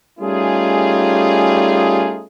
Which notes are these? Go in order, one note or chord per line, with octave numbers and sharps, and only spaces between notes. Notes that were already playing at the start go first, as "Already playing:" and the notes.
G3 A3 C#4 D#4 F4 G#4